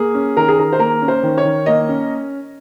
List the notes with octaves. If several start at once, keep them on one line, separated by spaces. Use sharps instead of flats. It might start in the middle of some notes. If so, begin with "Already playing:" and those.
Already playing: A#3 G#4
C#4
D#3 A#4
G#4
D#3 A#4
C5
A#3 A#4
C#4
C5
D#3
C#5
D#3
A#3 D#5
C#4